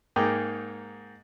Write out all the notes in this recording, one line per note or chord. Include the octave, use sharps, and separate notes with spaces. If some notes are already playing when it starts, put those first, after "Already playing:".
G#2 A#3 D#4 G#4 G5 D6